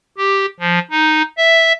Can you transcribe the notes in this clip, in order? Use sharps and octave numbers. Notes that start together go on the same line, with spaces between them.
G4
F3
D#4
E5